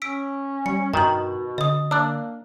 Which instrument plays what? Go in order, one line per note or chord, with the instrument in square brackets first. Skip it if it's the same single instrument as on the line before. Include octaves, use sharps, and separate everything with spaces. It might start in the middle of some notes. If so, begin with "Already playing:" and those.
[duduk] C#4 [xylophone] E6 B6 D7
[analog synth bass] G3 [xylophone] C#7
[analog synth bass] G2 [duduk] B2 [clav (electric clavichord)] D#3 [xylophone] A#5 F#7
[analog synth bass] D3 [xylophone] D#5 D#6
[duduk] A#3 [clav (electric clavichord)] D4 [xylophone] E6 F#6